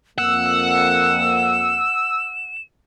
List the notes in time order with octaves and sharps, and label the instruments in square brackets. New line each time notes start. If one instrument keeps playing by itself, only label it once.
[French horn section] F2 A#3 [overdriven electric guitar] F#5 [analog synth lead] E6 [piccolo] E7